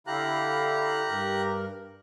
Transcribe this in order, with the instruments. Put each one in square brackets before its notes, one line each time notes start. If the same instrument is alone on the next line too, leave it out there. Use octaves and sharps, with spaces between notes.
[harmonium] D3 E4 F5 [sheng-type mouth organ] G4 A#5 F#6
[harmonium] G2 A#4